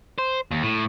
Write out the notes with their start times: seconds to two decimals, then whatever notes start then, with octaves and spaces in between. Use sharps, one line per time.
0.18 C5
0.51 D#2
0.63 A2